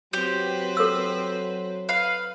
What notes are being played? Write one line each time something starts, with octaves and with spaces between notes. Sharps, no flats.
F#3 C4 G4 B4 C5
A4 E6
B4 F5